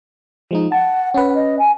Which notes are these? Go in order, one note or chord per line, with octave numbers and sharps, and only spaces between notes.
F3 G#3 D#4
F#5 A5
C#4 B4 F#5
D#5
G#5